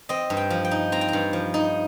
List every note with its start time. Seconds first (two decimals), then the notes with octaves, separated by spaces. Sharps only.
0.09 C4 D#5
0.30 G2
0.37 G5
0.50 F3
0.65 G5
0.71 D#4
0.92 C4 A#5
1.01 G5
1.08 G2 A#5
1.33 F3
1.54 D#4